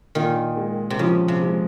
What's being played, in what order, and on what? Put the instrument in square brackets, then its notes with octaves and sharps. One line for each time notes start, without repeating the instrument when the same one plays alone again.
[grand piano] A#2 [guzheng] D#3
[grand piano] G#3
[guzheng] C3
[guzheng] C#3 [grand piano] F3
[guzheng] C3
[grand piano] G#3